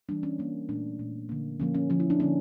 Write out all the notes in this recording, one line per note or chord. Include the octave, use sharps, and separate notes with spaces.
E3 G3 A#3 D4
C#4
E3 G3 A#3
A#2 A3 D4
A#2 A3
D3 F3 A#3
D3 F3 A#3 C#4
C#4
D3 F3 A#3 C#4
E4
D4
D3 F3 A#3 C#4